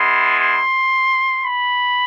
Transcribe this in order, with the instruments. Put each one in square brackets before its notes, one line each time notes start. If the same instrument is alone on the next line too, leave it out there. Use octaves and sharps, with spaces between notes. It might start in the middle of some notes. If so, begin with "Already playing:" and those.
Already playing: [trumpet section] G#3 B3 E4 C6
C6
B5